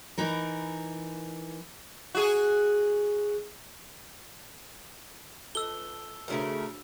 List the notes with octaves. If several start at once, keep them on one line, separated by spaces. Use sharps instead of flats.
E3 D#4 A#4
F#4 G#4
F4 A4 A5 E6 G7
C#3 A3 D4 F#4 A#4 D#5